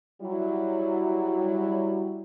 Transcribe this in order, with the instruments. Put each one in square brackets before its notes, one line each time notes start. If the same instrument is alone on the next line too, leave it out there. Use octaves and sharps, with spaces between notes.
[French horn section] F#3 G3 E4